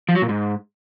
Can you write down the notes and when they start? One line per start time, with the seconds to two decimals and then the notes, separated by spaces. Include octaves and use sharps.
0.09 F3
0.15 F#3
0.22 A#2
0.29 G#2